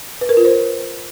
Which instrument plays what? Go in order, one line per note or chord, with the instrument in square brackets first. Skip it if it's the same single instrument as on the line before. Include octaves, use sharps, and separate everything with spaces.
[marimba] B4
A#4
F4
C5